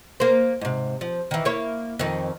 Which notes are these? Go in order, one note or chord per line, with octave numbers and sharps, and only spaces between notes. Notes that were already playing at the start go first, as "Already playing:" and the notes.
A#3 C5
G#2 C3
F3
D#3 E3
A#3 E4 C#5
F2 D#3